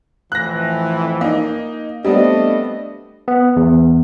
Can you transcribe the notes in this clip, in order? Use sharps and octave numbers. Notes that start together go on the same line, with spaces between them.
F2 A2 E3 F#6 A#6
A#3 D#4
G3 A3 B3 C4 D4 D#5
B3
E2